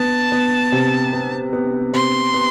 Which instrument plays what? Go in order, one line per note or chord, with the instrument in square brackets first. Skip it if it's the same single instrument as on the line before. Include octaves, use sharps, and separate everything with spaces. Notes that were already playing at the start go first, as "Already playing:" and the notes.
Already playing: [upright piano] B3 [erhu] A5
[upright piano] B3
C3
B3
B3
[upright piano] C3 [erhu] C6
[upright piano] B3